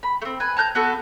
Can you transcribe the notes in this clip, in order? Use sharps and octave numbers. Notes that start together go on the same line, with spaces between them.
B5
A3 C4
B4 G#5
A5 A#5 F#6 G6
B3 F#4 A4